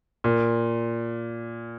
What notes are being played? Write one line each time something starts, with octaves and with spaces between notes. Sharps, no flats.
A#2